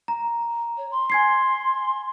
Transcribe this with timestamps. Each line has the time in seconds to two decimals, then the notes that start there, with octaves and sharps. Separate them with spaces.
0.08 A#5
0.77 C#5
0.91 C6
1.10 G#5 G#6 C7